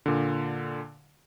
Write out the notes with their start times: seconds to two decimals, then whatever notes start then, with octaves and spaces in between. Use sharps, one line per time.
0.06 A#2 D3